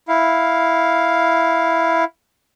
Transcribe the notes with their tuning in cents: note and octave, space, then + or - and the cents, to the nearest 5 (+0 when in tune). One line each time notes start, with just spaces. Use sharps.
E4 +0 F5 +0